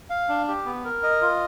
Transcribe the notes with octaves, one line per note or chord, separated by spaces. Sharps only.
F5
D4
G4
B3
A#4
D#5
F4